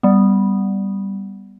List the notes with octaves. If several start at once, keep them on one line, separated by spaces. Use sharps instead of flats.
G3 B3